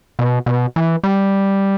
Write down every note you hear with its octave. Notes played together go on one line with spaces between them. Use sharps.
B2
B2
E3
G3